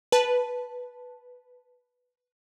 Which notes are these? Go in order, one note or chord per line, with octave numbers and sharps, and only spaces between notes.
B4 A5